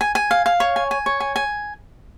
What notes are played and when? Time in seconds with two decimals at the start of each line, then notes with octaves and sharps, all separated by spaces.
0.01 G#5
0.15 G#5
0.31 F5
0.46 F5
0.60 C#5
0.76 G#5
0.91 G#5
1.06 C#5
1.20 G#5
1.36 G#5